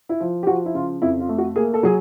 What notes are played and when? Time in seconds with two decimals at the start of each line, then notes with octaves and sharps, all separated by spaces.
0.09 E4
0.20 F3
0.43 G4
0.47 F3 F#4
0.66 E4
0.74 C#3 F4
1.02 F2 E4
1.20 F4
1.29 A3
1.38 F#4
1.56 A#3 G#4
1.74 A4
1.83 F#3 G#4